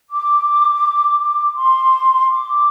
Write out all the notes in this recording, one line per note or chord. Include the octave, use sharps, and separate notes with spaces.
D6
D6
C6
D6